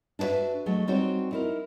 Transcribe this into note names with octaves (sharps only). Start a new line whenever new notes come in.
D4 E4 F#4 B4 E5
F#3 G#3 A3
G3 C4 D#4 F#4 C#5
D#4 E4 A#4